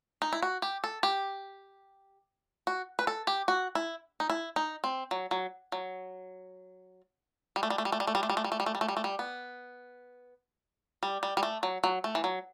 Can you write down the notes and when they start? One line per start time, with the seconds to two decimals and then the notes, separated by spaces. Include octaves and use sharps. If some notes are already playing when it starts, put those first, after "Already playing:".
0.22 D#4
0.33 E4
0.42 F#4
0.62 G4
0.84 A4
1.03 G4
2.67 F#4
2.99 B4
3.07 A4
3.27 G4
3.48 F#4
3.75 E4
4.20 D#4
4.30 E4
4.56 D#4
4.84 C4
5.11 F#3
5.31 F#3
5.72 F#3
7.56 G3
7.63 A3
7.70 G3
7.78 A3
7.85 G3
7.92 A3
8.00 G3
8.07 A3
8.15 G3
8.23 A3
8.29 G3
8.37 A3
8.44 G3
8.52 A3
8.60 G3
8.66 A3
8.75 G3
8.81 A3
8.88 G3
8.97 A3
9.04 G3
9.19 B3
11.03 G3
11.23 G3
11.37 G3
11.43 A3
11.63 F#3
11.84 F#3
12.04 A3
12.15 E3
12.24 F#3